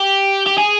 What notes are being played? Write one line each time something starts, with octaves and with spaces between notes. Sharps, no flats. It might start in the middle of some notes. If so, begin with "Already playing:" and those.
Already playing: G4
G4
G#4